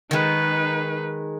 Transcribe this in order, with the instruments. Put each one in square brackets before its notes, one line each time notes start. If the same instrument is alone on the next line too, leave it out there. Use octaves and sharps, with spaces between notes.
[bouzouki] D#3 G#3 [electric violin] D#4 B4